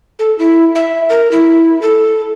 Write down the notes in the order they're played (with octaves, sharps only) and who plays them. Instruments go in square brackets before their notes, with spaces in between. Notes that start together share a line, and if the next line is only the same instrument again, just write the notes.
[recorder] A4
E4
E5
A#4
E4
A4